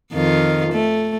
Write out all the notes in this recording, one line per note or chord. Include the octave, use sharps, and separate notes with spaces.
F2 D#3 F4
A3